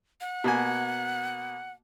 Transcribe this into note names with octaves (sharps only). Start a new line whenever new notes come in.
F#5
B2 A#3 G#5